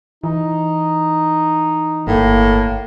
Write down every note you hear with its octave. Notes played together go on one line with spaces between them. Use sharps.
E3 D#4
G1 A2 A#3